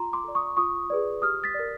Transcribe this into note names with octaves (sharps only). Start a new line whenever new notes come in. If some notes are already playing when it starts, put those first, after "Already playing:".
Already playing: F4 A#5 C6
C6 D6
A4 D5
C#6 D#6
F4 C#6 D#6
G#4 B4 D5
G4 D#6 F6
A6 B6
A#4 D5